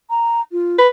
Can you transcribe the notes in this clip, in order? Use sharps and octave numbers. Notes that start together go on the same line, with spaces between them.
A#5
F4
B4